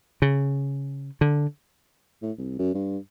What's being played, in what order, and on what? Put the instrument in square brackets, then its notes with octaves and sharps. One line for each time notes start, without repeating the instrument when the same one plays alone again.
[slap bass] C#3
D3
[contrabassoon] A2
C2
F#2
G2